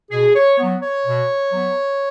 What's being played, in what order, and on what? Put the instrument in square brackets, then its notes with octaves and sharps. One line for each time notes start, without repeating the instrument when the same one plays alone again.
[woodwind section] B2 G#4
C#5
F#3 B3
C#5
B2
F#3 B3